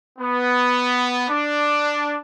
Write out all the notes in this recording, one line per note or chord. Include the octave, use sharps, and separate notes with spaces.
B3
D4